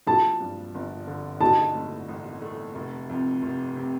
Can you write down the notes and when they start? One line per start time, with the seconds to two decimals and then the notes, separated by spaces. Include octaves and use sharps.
0.06 F3 A5
0.40 G2
0.75 G1
1.07 D3
1.41 D#4 A5
1.75 A2
2.08 A1
2.42 A3
2.75 F1
3.10 F2
3.43 F1
3.76 C3